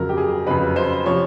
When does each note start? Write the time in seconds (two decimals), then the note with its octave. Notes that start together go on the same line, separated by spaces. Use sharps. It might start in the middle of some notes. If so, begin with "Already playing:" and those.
Already playing: F2 C#3 F#3 A#4
0.09 G4
0.17 G#4
0.46 F2 C#3 F#3 B4
0.76 C5
1.05 C3 F3 C#5